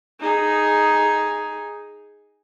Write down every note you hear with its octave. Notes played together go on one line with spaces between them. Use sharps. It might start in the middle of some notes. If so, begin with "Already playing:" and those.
D#4 G#4